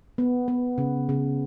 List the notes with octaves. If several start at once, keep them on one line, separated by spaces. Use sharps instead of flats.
B3
B3
C#3
C#3